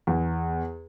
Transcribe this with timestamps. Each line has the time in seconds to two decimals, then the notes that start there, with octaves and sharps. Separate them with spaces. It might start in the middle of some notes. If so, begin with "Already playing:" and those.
0.07 E2